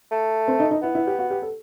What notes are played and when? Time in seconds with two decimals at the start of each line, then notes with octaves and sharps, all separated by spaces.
0.12 A3
0.48 C4
0.60 D#4
0.71 D#4
0.82 B3 E4
0.95 E4
1.07 G4
1.19 F#4
1.30 G4
1.42 A4